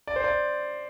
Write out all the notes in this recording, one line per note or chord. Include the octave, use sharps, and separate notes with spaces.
D5
C5
D5